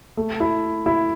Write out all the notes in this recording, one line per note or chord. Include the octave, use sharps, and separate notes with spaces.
A3
E4
E4